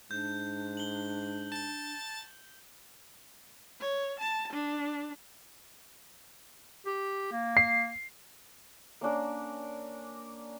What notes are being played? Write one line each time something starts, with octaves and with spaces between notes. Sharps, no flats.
G#2 D4 G6
F#7 G7
A5 A6
C#5
A5
D4
G4
A#3
C7
A#3 C#4 D4 A#4